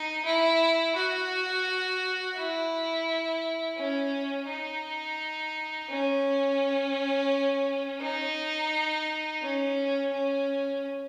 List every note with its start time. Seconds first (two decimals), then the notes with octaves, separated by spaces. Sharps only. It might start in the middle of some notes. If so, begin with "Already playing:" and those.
Already playing: D#4
0.25 E4
0.96 F#4
2.36 E4
3.77 C#4
4.48 D#4
5.89 C#4
8.01 D#4
9.42 C#4
10.12 C#4